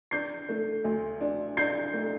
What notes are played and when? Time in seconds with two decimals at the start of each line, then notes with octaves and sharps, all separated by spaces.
0.11 D4 G6 C7
0.49 A3
0.84 D2
1.21 D4
1.57 D4 G6 C7
1.93 A3